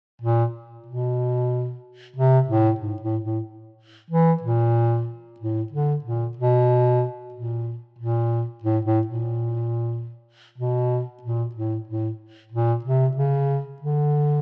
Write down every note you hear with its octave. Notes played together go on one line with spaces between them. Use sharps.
A#2
B2
C3
A2
G#2
A2
A2
E3
A#2
A2
D3
A#2
B2
A#2
A#2
A2
A2
A#2
B2
A#2
A2
A2
A#2
C3
C#3
D3